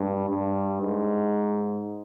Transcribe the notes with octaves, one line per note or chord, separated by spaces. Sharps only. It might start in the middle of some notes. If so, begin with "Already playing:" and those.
Already playing: G2
G2
G#2